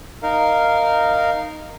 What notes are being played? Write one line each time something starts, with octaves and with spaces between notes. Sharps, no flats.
D#4 A#4 F5